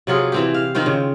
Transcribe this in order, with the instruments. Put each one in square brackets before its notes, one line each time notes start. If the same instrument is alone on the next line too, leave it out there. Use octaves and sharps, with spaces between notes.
[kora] C3 F#3 F4 G#4
E3 C4 G4
F5
D#3 C4 F4 C5
C#3